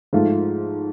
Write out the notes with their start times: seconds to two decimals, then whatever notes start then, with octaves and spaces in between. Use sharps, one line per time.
0.13 G#2 F3 A3 F4